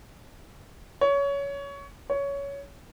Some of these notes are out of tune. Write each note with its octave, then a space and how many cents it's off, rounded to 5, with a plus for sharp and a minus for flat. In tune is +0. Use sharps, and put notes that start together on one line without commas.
C#5 +20
C#5 +15